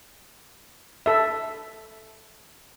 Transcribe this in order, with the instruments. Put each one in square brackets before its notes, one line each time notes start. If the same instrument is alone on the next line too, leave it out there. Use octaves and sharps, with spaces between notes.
[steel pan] A4 E5